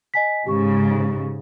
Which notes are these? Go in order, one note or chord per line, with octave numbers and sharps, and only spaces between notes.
D#5 G#5 B6
G#2 C#3 G4 C#6